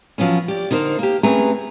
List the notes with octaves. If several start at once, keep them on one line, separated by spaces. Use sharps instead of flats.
F3 F#3 B3 C#4
G4 D5
D3 D#4 A#4 C5
A#3 G4
A3 C4 C#4 G#4 B4 A#5